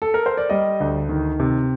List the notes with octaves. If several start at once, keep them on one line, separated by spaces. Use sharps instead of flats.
A4
A#4
C5
D5
G3 D#5
D2
D#3
C3